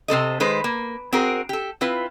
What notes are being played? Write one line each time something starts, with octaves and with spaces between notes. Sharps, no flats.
C3 C4 A4 D#5
D#3 G#3 B4 C5
A#3
C4 F#4 G#4 A#4
G4 A4
C4 E4 F4 B4